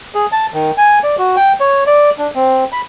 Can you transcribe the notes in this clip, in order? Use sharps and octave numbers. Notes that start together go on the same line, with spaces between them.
G#4
A5
D#3
G#5
D5
F#4
G5
C#5
D5
D4
C4
B5